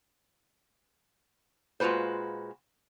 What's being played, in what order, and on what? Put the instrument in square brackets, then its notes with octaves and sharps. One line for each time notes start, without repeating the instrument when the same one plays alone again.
[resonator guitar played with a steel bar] A#2 G#3 F4 F#4 B4 C5